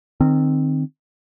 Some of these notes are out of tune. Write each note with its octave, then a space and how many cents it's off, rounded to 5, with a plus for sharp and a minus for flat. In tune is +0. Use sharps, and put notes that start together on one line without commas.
D#3 -25 C4 +0